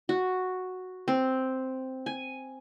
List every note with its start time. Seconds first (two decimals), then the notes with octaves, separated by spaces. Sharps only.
0.09 F#4
1.08 C4
2.06 G#5